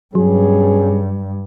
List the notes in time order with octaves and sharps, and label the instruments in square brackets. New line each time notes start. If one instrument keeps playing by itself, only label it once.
[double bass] G2 [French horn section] B2 C#4 G#4 [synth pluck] F#3